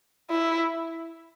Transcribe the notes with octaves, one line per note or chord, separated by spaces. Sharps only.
E4